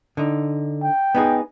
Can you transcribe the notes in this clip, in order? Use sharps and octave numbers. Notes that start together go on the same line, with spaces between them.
D3 D#4
G5
B3 D#4 G#4